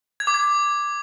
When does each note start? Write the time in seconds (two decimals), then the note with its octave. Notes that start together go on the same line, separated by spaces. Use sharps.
0.20 G#6
0.27 D6
0.34 G#6